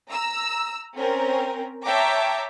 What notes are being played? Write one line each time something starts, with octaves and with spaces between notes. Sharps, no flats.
A#5 E6
C4 C#4 A#4
C#5 E5 G5 A5 A#5 D6